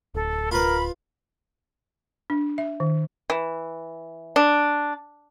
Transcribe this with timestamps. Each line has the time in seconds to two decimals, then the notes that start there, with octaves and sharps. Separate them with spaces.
0.14 D1 A4
0.51 F4 A#4 B4 B5
2.30 D4
2.58 E5
2.80 D#3
3.30 E3
4.36 D4